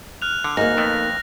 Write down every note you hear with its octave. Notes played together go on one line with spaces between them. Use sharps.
F6 F#6 F7
D3
G#1 G#2 A#3 D#4 A#6
F2 A3 B3